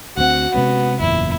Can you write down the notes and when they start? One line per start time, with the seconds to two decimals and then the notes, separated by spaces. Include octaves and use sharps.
0.17 D2 C4 F#4 F#5
0.55 C3 G#3 B3 C#4
1.00 F#1 E2 A#2 E4